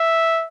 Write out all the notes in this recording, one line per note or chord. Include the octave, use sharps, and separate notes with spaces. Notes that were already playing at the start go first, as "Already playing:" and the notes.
Already playing: E5